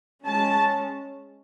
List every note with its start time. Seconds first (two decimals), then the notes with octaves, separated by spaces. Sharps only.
0.25 G#3 C#4 A5